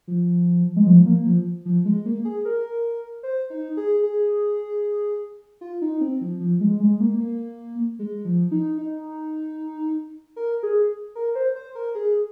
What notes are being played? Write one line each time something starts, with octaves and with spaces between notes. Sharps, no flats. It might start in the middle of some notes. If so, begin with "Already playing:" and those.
F3
G#3
F3
A#3
F3
F3
G#3
A#3
G#4
A#4
C5
D#4
G#4
G#4
F4
D#4
C4
F3
F3
G#3
G#3
A#3
A#3
G#3
F3
D#4
D#4
A#4
G#4
A#4
C5
C5
A#4
G#4